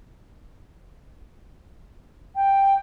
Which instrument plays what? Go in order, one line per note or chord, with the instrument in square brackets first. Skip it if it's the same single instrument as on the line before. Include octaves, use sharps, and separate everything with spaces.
[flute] G5